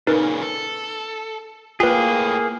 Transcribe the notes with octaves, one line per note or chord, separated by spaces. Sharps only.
A#2 C#3 D#4 A#4 B4
A4
A2 A#3 F4 G#4 B4 G5